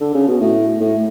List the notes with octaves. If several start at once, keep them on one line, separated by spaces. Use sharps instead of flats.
D3
C#3
B2
A2
A2